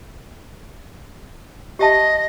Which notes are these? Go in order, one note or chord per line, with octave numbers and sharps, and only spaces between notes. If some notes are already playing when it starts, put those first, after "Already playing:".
G4 D#5 E5 A5